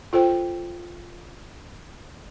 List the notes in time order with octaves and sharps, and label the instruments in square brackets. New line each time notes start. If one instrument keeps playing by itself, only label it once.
[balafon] F4 A4 C5 G5